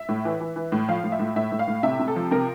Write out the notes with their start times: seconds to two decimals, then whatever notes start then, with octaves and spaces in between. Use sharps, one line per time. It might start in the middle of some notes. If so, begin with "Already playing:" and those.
Already playing: E5
0.09 A2
0.25 E3
0.40 E3
0.56 E3
0.72 A2
0.89 F3 F5
1.04 A2
1.12 E5
1.19 A2
1.36 A2 E5
1.52 A2
1.59 F5
1.68 A2
1.83 C3 E5
1.99 C3
2.08 A4
2.16 F3
2.31 C3 A#4